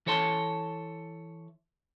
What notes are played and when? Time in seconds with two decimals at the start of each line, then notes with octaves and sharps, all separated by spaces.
0.06 E3 A4 C#5 A5 C6